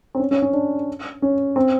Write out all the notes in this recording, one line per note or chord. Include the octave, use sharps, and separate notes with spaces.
C4
C#4
C#4
C#4
D4
C#4
C4